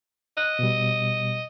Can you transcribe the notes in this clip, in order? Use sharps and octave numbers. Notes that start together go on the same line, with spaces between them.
D#5 F#6
B2 G3